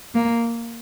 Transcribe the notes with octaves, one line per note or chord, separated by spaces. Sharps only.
A#3